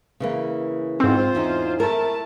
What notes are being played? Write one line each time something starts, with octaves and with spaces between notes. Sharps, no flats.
C#3 E3 A#3
G#2 C4 F4 C5
E2 C#4 D#4
A3 E4 A#4 A5